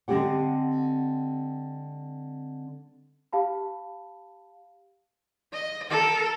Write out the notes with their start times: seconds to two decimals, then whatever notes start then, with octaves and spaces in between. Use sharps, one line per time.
0.08 D3 G#3 C4 E4 G4 F#5
3.33 G4 F5 A5 B5
5.52 D#5
5.89 A4 A#4